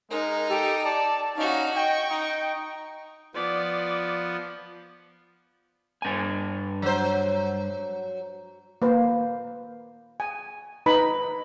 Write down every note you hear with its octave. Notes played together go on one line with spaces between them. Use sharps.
G#3 D#4 A#4
G4 A4
D5 A5
C#4 D#4 F#4 F5
D#5 G5 C#6
D#4 G5
F3 B3 D5
G2 G#5
F#3 C5
A#3 B4 C5
G#5
D#4 B4 B5